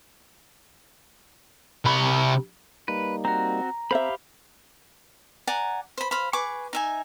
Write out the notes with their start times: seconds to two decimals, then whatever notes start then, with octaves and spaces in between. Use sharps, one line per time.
1.85 C3 B5
2.88 G3 A#3 D#4 B4
3.25 C4 F#4 A#5
3.91 C4 G4 C5 E5 F5 B5
5.47 D5 F#5 G#5 A#5
5.98 C5 B5
6.11 C5 F5 B5
6.33 G#4 B4 C#6 D6
6.73 D#4 E5 G#5